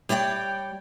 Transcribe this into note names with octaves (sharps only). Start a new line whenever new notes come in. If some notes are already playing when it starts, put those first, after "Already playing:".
G3 C#5 D5 E5 G5